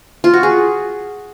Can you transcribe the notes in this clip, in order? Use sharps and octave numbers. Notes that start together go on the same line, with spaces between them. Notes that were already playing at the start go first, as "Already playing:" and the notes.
F4
F#4
G#4